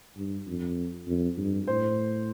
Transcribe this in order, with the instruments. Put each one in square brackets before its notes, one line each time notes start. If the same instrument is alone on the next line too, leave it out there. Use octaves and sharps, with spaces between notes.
[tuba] G2
F2
F2
G2
[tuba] A2 [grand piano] C5